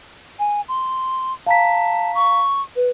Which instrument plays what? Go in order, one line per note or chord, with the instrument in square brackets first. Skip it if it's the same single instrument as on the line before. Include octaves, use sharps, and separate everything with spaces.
[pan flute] G#5
C6
[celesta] F5 A#5 B6 [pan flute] A5
[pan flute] C#6
B4